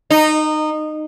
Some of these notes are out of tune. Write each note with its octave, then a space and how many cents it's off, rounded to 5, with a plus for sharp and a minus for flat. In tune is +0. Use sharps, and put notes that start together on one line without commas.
D#4 -20